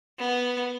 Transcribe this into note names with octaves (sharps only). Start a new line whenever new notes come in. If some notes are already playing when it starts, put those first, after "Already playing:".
B3